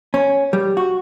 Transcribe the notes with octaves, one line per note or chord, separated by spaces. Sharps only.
C#4
G3
F#4